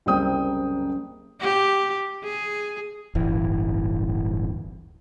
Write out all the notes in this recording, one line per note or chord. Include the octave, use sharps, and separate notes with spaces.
F#1 C2 C5 G5 D#6
G4
G#4
D1 G1 E3